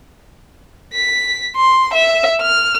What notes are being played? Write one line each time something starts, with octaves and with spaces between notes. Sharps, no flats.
B6
C6
E5
F6